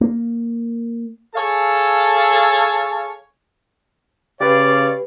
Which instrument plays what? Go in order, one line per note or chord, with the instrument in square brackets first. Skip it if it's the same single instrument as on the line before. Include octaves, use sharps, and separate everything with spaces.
[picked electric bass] A#3
[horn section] G#4 A4 C#5 F5 A5
[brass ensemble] C#3 C#5 F5 [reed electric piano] G4 B4 [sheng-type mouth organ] D5 D6